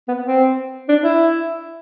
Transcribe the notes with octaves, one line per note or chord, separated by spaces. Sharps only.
B3
C4
D4
E4